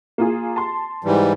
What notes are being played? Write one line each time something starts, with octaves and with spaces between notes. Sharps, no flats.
A#3 F4 G#4
A5 C6
G#2 E3 G3